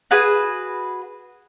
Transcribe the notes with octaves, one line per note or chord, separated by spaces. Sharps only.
F#4 G#4 B4